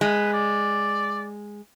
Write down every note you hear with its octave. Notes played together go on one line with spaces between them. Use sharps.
G#3 B4
D5